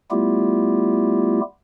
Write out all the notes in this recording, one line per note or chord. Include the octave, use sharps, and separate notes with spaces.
G3 A3 B3 E4 F4 G4